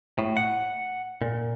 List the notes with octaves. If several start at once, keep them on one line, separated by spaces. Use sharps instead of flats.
A2
F#5
A#2